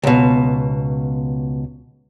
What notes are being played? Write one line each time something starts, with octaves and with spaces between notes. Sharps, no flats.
C#2 B2